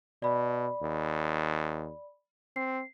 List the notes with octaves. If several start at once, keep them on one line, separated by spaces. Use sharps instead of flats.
B2 D5 B5
D#2
C4 C7